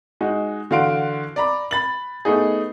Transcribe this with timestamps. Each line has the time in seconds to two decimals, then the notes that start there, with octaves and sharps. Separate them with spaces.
0.21 G#3 D#4 F#4
0.71 D3 E3 F#4 F5 C6 D7
1.36 D5 A#5 B5
1.71 B5 A6 F#7
2.25 A3 B3 D#4 G#4